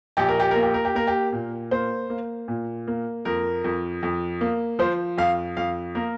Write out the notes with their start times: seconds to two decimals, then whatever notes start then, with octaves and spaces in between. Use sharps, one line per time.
0.17 A#1 G4
0.28 A#4
0.40 G4
0.51 A#3 A#4
0.63 G4
0.74 A#4
0.85 G4
0.95 A#3 A#4
1.07 G4
1.32 A#2
1.71 A#3 C5
2.10 A#3
2.48 A#2
2.87 A#3
3.25 F2 A#4
3.64 F2
4.03 F2
4.41 A#3
4.79 F3 C5
5.18 F2 F5
5.57 F2 F5
5.95 A#3 A#4